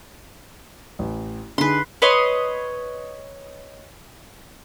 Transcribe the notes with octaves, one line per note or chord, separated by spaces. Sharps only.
A1
D3 D#4 G#4 B4 C6
B4 C#5 D#5 C6